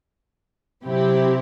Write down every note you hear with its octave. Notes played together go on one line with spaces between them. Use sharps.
C3 F#3 C4 E4 G4